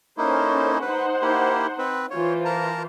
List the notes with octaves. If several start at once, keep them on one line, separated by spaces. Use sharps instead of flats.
A#3 C#4 D#4 E4 A4 C5
D#4 B4 C5 F#5
A#3 E4 G4
C4 B4
E3 F4 C5 C#5
A#4 A5 A#5